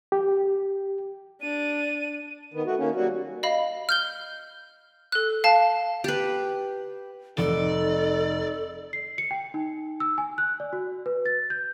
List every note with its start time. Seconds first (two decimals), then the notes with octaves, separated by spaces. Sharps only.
0.12 G4
1.42 D4 D#7
2.54 D#3 B3
2.66 A3 F#4
2.79 D#3 A#3 C#4
2.95 F#3 G3 A#3 F#4
3.43 D#5 F5 B5
3.89 F6 G6 G7
5.12 A4 F#6
5.44 F5 A5
6.04 G4 B4
7.38 F1 D#4 A4 D5
8.93 C7
9.18 C#7
9.31 G5
9.54 D#4
10.00 E6
10.18 G#5
10.38 F#6
10.60 D5
10.73 F#4
11.06 B4
11.26 A6
11.50 G6